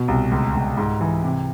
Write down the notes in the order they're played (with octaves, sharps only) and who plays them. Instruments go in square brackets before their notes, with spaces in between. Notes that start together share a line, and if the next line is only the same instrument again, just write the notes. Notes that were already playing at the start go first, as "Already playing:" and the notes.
Already playing: [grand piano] B2
C2
C#2
C#2
G#2
E3
C3